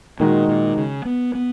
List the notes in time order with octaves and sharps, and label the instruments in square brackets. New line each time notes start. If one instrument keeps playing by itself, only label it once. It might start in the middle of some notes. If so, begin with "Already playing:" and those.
[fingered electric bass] A#2 [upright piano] D#3 G#3 D#4 F#4
[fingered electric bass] A#2
C#3
B3
B3